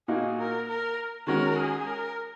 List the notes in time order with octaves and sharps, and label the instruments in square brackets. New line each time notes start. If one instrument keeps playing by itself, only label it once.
[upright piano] A#2 A#3 D#4 F#4 [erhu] G#4
[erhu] A#4
A#4
[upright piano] D#3 G#3 C#4 F#4 [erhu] A#4
[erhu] G#4
A#4